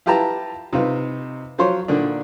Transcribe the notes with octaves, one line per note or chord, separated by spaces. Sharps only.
E4 F4 G4 B4 A5 A#5
C3 D#4 F4 B4
F3 F#3 F4 C5 C#5
A#2 D3 D#3 D4